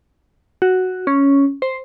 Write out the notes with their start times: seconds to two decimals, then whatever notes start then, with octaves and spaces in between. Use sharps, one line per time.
0.62 F#4
1.07 C#4
1.62 C5